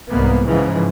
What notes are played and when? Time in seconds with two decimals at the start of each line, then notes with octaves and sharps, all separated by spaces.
0.10 C2 G#2 A#3 B3
0.45 G#2 C#3 E3 F3